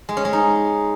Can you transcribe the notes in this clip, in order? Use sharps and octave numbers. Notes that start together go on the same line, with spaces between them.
G#3
C#4
G#3
D#4